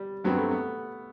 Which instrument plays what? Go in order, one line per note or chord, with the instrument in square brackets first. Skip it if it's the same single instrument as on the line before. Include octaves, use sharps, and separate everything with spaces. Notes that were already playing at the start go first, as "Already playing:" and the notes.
Already playing: [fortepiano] G3
[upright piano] G2 F#3 C4 F#4 B4 [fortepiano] B3
[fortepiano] A3
B3